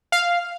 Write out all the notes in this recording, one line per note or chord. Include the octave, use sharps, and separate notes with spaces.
F5